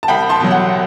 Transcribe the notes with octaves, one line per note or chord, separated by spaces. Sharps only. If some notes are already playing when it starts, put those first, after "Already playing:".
A5
C2 G5 B5
A5 C6
B2 F#3
F#5